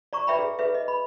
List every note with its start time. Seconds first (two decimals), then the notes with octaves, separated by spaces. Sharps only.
0.13 D5 A#5 C#6
0.27 B4 D5 E5 G5 A#5 B5
0.39 G#4
0.59 G#4 B4 E5
0.74 D#5
0.88 B5